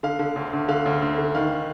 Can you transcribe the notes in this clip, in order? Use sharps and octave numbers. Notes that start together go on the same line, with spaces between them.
D3 F5
D3
D2
D2
D3 F5
D2
D2
D3
D#3 F5